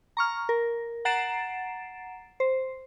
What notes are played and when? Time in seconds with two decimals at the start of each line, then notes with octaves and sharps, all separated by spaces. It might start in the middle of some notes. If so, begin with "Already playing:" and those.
0.17 A#5 C#6 F6
0.49 A#4
1.05 F#5 A#5 A6 C7 D7 E7
2.40 C5